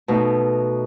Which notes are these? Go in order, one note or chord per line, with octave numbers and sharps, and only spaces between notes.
B2 A3 D#4